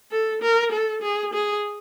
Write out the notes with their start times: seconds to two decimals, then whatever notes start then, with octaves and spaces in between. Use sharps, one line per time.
0.11 A4
0.42 A#4
0.72 A4
1.02 G#4
1.34 G#4